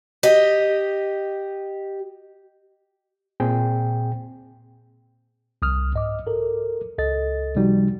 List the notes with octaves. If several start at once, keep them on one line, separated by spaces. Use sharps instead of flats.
G4 D#5
A#2 C4 G#4 G5
C2 D#6 F6
G#2 D#5 D6
A4 A#4
C#2 A4 D#5 A6
C3 F3 G3 D#4 F#4